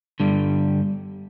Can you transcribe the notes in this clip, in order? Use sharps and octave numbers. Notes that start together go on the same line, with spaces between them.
G2 D3 G3